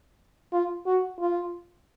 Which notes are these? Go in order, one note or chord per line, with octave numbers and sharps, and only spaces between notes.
F4
F#4
F4